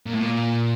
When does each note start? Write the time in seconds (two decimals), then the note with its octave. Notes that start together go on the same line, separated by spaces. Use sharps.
0.07 A#2
0.14 A2
0.21 A#2